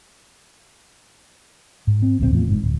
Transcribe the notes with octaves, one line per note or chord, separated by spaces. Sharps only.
G#2
C4
D1 A#1 A#2 C4
E2 A2 F3
F#1 G#2
D1